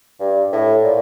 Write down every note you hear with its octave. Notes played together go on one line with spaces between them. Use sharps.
G2
A2
A#2